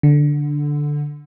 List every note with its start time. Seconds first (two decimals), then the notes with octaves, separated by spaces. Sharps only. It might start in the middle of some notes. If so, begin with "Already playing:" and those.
0.03 D3